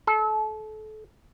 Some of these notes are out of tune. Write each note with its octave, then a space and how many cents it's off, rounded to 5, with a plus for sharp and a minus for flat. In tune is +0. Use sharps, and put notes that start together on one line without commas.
A4 -30